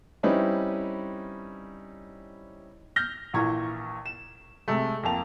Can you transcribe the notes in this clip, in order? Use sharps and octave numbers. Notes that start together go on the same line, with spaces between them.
G3 C4 C#4 D#4 E4 B4
F6 G6 A#6 G7
A#1 A#2 E3 A#5 C#6 G#6
E7
C3 G#3 A3
F2 A#3 G5 A5 F7